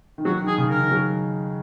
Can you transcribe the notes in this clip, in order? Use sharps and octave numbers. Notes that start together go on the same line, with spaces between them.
D#3
F#3 F#4
D#3
G#4
C#3
A#4
D#3
F#3